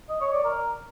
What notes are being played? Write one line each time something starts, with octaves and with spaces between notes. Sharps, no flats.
D#5
C#5
D5
A#4